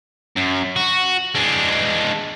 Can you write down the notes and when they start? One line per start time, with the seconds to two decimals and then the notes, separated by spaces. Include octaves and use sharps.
0.37 F#2
0.76 F#4
1.35 G#3 D4